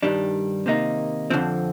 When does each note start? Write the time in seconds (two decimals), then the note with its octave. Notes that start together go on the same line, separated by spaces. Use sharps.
0.03 G2 D#3 G3 D4
0.66 C3 D#3 A#3 D#4
1.30 F2 D3 F3 C4